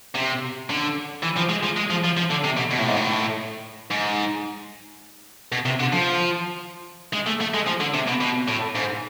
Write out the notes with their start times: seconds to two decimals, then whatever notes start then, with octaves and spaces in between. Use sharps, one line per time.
0.15 C3
0.70 D3
1.23 E3
1.37 F3
1.50 G#3
1.64 F3
1.77 G#3
1.90 F3
2.04 F3
2.17 F3
2.30 D3
2.44 C3
2.57 B2
2.71 B2
2.79 A2
2.88 G#2
2.96 A2
3.91 G#2
5.52 B2
5.66 C3
5.80 D3
5.92 F3
7.13 G#3
7.26 A3
7.41 A3
7.54 G#3
7.67 F3
7.80 D3
7.94 C3
8.08 B2
8.21 B2
8.48 A2
8.75 G#2